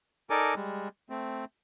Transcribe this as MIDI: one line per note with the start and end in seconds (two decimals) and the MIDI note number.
0.30 0.54 63
0.30 0.54 69
0.30 0.54 70
0.30 0.54 74
0.30 0.54 80
0.30 0.54 86
0.55 0.88 55
0.55 0.88 56
1.10 1.45 57
1.10 1.45 60